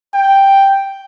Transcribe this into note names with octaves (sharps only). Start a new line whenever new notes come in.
G5